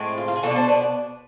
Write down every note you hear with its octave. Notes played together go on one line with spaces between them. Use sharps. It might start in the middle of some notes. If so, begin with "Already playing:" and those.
Already playing: A2 G#3 C4
F4
F4
G#4
B2 B3 D4 F4 A4
A4 C5
B4 D5